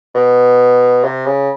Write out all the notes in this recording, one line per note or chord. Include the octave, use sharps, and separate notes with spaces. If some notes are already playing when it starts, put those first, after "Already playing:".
B2
C3
C#3